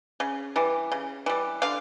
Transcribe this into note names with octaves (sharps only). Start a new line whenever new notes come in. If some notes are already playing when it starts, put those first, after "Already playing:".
C#3
E3 G3
C#3
E3 G3
D3 F5